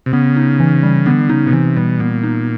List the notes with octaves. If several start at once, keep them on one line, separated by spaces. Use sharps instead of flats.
C3
C#3 B3
D#4
E3
G3
D3 B3
C#3 D#4
B2
C3 E3
B2 G3
A#2 B3
D#4